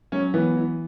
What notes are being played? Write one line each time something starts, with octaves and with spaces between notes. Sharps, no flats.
F#3 C#4
E3 B3
E3